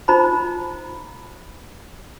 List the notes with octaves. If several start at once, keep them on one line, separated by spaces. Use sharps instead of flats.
D#4 F4 C5 A#5 B5